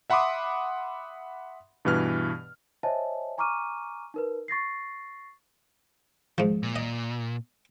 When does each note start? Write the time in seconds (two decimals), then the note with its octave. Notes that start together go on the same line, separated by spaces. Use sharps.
0.10 E5 F#5 B5 C6 D6 D#6
1.85 G2 B2 E3 B4 F6
2.83 C5 C#5 D#5 E5 G#5 A5
3.38 G#5 A#5 C#6 D6 F6 D#7
4.14 D#4 A#4 B4
4.48 C#6 A6 A#6 C7
6.38 G#2 F3
6.63 A#2
6.76 D#5